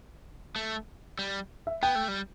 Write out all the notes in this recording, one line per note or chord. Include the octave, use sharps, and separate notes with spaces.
A3
G3
E5
B3 G5
A3
G3